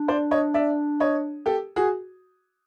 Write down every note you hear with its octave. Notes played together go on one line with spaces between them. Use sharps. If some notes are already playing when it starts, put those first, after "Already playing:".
Already playing: D4
C5 D5
C#5 D#5
D5 E5
C#5 D#5
G4 A4
F#4 G#4